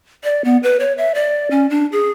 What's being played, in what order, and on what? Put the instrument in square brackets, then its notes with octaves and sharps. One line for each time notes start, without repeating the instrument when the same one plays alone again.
[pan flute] D5
B3
B4
C#5
E5
D5
C#4
D4
G#4